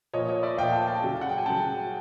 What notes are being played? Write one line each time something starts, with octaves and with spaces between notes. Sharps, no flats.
A#2 F3 C#5 D#5
C#5 D#5
D5 E5
A#2 F3 F5 G5
G5 A5
G5 A5
C#3 F#3
F#5
G5
G#5
C#3 F#3 G5 A5